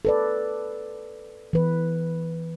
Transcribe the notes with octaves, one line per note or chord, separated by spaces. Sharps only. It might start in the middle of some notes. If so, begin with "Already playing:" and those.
A4 B4 D5
E3 B4